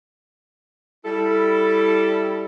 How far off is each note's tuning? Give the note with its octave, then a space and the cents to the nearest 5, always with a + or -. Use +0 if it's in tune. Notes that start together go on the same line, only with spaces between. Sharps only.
G3 +0 E4 +0 A4 +0